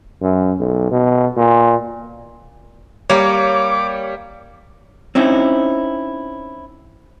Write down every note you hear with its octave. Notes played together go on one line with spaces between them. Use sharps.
F#2
B1
B2
A#2
G3 A#3 C#5 D6
C4 C#4 D#4 E4